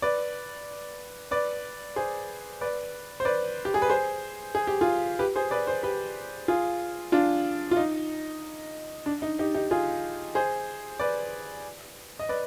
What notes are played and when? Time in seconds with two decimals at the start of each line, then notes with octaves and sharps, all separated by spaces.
0.02 B4 D5
1.31 B4 D5
1.96 G#4 C5
2.61 B4 D5
3.20 C5
3.25 B4 D5
3.65 G4
3.74 G#4
3.82 B4
3.89 G#4 C5
4.55 G#4
4.67 G4
4.81 F4 G#4
5.19 G4 B4
5.36 G#4 C5
5.51 B4 D5
5.67 G#4 C5
5.83 G4 B4
6.48 F4 G#4
7.12 D4 F4
7.71 F4
7.77 D#4
9.06 D4
9.22 D#4
9.39 D#4 G4
9.54 D#4 G4
9.71 F4 G#4
10.35 G#4 C5
11.00 B4 D5
12.19 D#5
12.29 B4 D5